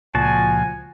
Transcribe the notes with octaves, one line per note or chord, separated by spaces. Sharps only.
C#2 A#2 F3 F#4 G#5 A5